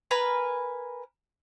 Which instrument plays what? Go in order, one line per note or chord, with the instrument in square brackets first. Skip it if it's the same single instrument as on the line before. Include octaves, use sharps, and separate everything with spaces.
[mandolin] A#4 B4 G#5 B5